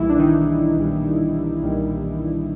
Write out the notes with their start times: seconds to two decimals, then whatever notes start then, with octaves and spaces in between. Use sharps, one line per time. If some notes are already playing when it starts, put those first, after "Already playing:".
Already playing: B1 A#2 E3 G3 E4
0.09 D4
0.19 D#3 D#4
0.76 B1 A#2 G3
1.63 B1 A#2 G3